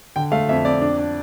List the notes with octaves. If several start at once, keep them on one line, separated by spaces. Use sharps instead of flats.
D3 G5
A3 F5
F2 E5
F2 D5
D4
D4